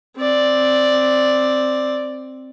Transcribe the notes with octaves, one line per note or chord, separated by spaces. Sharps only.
C4 D5